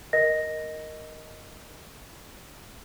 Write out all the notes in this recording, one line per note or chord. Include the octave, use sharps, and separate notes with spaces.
A#4 D#5 A#6